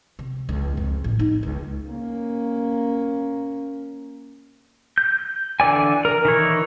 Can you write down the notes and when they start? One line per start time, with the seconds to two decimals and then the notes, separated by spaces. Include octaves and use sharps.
0.19 C3
0.49 C#2
0.77 F2
1.04 A1
1.19 D#4
1.43 C#2
1.89 A#3 C#4
4.98 G6
5.60 D3 E3 D5 G#5
6.05 A#4
6.25 D#3 E3 C#5